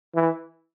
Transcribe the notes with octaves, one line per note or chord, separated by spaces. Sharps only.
E3